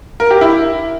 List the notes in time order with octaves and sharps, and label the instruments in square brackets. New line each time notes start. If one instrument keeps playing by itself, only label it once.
[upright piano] A#4
G4
E4